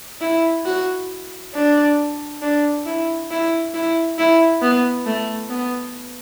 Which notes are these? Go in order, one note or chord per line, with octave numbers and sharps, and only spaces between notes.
E4
F#4
D4
D4
E4
E4
E4
E4
B3
A3
B3